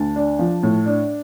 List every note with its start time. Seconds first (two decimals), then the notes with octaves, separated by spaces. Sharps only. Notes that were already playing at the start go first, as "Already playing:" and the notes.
Already playing: D2 A5
0.16 D4
0.39 F3
0.63 A2
0.86 D4